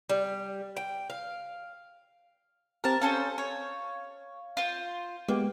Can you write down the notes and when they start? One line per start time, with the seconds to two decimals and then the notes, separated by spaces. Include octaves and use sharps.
0.09 G3
0.77 G5
1.10 F5
2.84 C4 G4 A#4 A5
3.02 C#4 A4 C5 F5
3.38 C#5
4.57 F4 C5
5.28 G#3 A#3 B3 G4